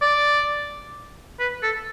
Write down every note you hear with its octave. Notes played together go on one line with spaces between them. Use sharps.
D5
B4
A4